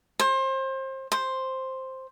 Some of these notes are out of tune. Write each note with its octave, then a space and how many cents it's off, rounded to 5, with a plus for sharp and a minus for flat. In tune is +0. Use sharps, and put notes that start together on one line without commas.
C5 +30
C5 +5